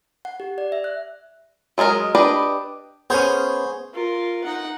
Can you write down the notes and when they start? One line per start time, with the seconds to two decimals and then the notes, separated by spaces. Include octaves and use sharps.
0.25 F#5
0.40 G4
0.58 D5
0.72 E5
0.84 F#6
1.78 F#3 G#3 C#4 A#4 D#5
2.15 D4 G4 B4 D#5
3.10 B3 C#4 G#4 C5 C#5
3.94 F4 A#4
4.44 D#4 F#5